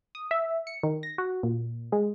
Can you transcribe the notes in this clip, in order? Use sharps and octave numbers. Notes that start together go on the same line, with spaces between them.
D#6
E5
C#7
D#3
A#6
F#4
A#2
G#3